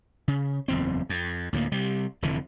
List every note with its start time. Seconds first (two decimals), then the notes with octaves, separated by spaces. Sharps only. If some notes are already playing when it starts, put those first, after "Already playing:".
0.28 C#3
0.68 F#1 E2 C4
1.09 F2
1.53 D2 A2 C#3 A#3
1.72 C3 G3
2.22 F1 F2 D3 E3